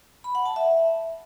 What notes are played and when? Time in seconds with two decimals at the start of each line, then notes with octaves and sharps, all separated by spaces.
0.24 B5
0.35 F#5
0.46 A5
0.56 E5